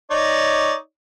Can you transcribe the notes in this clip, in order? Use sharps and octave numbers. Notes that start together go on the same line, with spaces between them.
D#4 C#5 D5